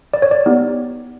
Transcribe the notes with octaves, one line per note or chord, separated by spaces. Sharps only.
D5
C#5
D5
B3 D#4 G4